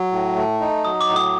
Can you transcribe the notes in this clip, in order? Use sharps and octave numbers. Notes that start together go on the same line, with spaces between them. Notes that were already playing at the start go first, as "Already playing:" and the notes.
Already playing: F#3
A2
A3
D#4
F#3 D#6
D6
A2
D#6